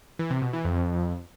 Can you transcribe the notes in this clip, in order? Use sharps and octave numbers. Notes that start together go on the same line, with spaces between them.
E3
C3
B2
E3
F2